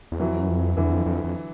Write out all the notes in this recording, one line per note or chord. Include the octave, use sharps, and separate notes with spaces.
E2
F2 E3 F#3
F#2
F2
F2 D3 E3
E2
F2
F2
F2